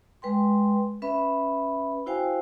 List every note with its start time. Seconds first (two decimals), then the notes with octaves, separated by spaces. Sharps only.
0.22 G#3 B4 G5 C6
1.02 C#4 B4 E5 B5
2.06 E4 F#4 C5 F5 G5 G#5